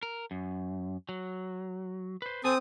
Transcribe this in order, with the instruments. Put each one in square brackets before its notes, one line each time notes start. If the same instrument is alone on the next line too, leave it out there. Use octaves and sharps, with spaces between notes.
[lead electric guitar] A#4
F#2
F#3
B4 C5
[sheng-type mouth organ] C4 D#6 [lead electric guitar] A4 G#5